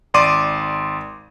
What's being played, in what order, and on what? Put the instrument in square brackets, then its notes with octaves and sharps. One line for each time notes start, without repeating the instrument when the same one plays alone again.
[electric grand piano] G#1 D5 C6 D6 D#7